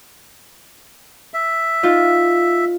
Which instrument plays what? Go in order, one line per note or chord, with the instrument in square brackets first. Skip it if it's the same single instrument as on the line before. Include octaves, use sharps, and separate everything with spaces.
[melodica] E5
[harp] D#4 F4